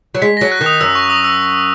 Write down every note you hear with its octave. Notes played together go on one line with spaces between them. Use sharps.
F#3
G#3 B6
F#3 A#6
F#6
D#3
D#6
F#2 E6
C#6
D#6
E6